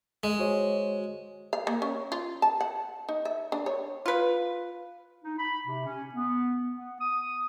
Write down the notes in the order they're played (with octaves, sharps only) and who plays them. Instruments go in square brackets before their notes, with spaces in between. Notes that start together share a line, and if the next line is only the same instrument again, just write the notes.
[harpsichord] G#3
[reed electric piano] F#4 C5 C#5
[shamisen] F5
A#3
C#4
F4
A5
F#5
D#4
E5
D4
C#5
[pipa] F4 B4
[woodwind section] D#4
B5
C3
C#4
B3
B3
D#6